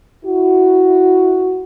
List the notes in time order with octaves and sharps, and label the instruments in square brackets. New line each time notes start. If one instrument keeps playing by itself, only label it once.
[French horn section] E4 F#4